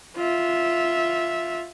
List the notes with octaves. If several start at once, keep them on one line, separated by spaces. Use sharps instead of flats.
F4 E5